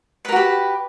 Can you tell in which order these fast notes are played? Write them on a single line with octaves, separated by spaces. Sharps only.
B4 A#4 F#4 G4